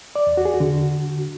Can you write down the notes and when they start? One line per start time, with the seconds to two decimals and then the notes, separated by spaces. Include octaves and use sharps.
0.16 D5
0.27 E2
0.37 F#4
0.45 G#4
0.54 F#4
0.60 D3